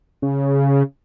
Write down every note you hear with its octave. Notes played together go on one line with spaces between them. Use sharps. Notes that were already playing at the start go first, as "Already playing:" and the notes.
C#3